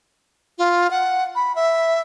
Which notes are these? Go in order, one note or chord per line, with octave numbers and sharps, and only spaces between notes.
F4
F#5
B5
E5